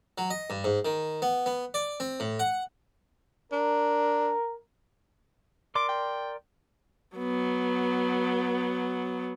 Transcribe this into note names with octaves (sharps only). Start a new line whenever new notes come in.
F#3
D#5
G2
G#2
D#3
B3
B3
D5
C4
A2
F#5
D4 A#4
A#4 D5 C6 D6
G5
F#3 B3